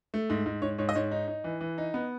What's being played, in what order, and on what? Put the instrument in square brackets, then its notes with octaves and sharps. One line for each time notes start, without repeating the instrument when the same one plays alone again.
[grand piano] A3
G#2
G#2
G#2 C#5
G#2 C#5
D#5
G#2 C#5
D#4
D#4
E3
E3
D#4
B3